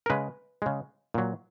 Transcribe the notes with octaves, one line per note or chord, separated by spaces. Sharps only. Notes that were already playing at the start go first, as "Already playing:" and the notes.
A#4
C#3 G#3 B4
C#3 G#3
A#2 F#3